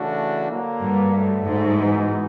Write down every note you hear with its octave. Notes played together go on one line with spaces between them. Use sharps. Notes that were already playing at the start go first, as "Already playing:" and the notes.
Already playing: C#3 E3 A3 D4 F#4
D3 F#3 A#3
G2
D3 F#3 A3
G#2
E3 G#3 B3 D#4 F#4